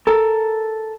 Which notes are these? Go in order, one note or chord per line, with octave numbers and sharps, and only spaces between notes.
A4 A#4